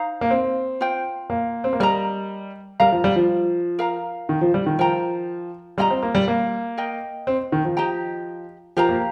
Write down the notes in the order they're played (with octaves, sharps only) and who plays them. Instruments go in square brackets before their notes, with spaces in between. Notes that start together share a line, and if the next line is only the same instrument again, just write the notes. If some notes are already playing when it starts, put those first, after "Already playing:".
Already playing: [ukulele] D#4 C5 F5 A#5
[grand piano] A#3
C4
[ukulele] F4 C5 G5
[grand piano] A#3
C4
A#3
[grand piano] G3 [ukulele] A#4 D#5 A#5
[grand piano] G3 [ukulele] A#4 F5 A#5
[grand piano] F3
G3
F3
[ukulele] A#4 F5 A#5
[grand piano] D#3
F3
G3
D#3
[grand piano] F3 [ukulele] A#4 G5 A#5
[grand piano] G3 [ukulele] F4 D#5 G5 A#5
[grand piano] C4
A#3
G3
A#3
[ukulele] A#4 D#5 G5
[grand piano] C4
D#3
F3
[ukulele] G4 D#5 G5 A#5
[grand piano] F3 [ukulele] G4 A#4 F5 A#5
[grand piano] A#3